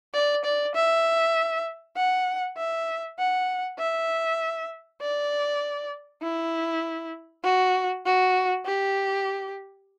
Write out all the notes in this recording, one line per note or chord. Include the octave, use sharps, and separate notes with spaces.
D5
D5
E5
F#5
E5
F#5
E5
D5
E4
F#4
F#4
G4